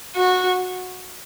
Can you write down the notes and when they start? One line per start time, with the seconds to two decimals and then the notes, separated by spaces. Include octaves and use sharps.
0.16 F#4